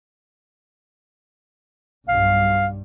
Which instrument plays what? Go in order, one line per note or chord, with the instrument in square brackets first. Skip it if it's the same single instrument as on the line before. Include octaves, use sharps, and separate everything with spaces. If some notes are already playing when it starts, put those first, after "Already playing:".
[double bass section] B1 G2 G3 [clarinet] F5